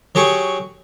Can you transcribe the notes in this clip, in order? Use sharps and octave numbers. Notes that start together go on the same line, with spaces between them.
F#3 G4 G#4 C#6